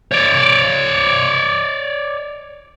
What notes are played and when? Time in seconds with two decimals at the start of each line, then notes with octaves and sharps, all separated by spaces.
0.12 C#5 D5